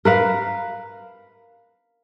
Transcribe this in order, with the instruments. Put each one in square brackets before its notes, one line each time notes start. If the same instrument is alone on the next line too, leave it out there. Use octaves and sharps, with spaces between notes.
[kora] A#4 B4 F5